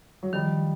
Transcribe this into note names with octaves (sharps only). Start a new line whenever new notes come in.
F#3
D#3 F3 G3